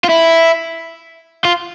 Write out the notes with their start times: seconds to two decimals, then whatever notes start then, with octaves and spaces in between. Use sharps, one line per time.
0.04 F4
0.09 E4
1.45 F4